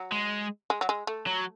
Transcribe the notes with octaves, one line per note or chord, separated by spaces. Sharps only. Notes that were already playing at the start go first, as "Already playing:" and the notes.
Already playing: F#3
G#3
G#3
F#3
G#3
A3
F#3